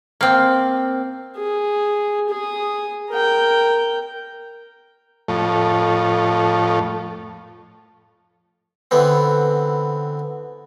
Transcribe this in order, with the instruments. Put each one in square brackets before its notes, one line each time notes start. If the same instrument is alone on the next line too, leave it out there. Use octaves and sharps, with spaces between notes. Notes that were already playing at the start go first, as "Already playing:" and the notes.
[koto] A#3 C4
[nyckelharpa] G#4
G#4 D#6
A#4 G5
[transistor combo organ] F2 A2
[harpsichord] D3 E3 B3 C4